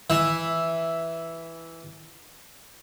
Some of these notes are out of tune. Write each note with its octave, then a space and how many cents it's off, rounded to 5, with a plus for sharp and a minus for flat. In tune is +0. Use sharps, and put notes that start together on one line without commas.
E3 +0 E5 +0